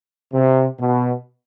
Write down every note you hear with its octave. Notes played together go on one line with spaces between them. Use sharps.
C3
B2